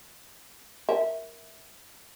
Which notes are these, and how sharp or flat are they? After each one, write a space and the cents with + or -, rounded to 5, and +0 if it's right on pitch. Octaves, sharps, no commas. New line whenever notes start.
A#4 +0 E5 -15